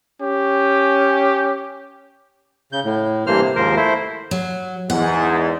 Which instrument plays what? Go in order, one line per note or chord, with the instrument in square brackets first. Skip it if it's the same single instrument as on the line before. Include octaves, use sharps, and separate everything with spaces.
[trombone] C#4 [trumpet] G4
[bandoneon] C#3 G6
A2
G2 E3 A#3 C5 F6
C3
D#2 G#2 F3 A#4 C5
A3 E4 C5
[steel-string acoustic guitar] F#3
[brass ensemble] E2 G#2 [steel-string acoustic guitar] F#5